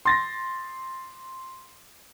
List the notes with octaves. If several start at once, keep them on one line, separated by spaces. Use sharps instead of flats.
C6 A6 A#6